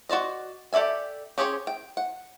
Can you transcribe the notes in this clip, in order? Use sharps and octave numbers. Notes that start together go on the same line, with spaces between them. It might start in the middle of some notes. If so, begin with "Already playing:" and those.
F#4 C5 D5 D#5
G4 A4 D5 E5 G#5
C#4 G4 G#4 C5 C#5
G5
F#5